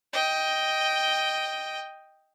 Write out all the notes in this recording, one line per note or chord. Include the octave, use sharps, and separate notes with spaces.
D#5 G5